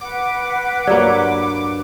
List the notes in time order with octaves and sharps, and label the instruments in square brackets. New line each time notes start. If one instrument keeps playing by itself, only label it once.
[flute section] B4 F#5 [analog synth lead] D6
[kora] G2 F#3 A#3 [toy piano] D5